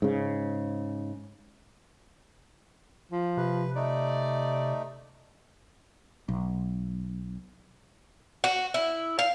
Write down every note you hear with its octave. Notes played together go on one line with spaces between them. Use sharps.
G#2 C#3
F3
C3 B4
A3 D#4 D5
B1
F#4
E4
F5